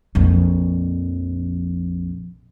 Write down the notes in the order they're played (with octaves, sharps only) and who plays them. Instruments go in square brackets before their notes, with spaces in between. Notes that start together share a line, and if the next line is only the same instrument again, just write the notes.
[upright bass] A#1 F2